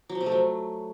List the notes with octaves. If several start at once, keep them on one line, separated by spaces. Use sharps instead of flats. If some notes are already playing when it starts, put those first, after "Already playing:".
F#3
F3
C3
A3
F#3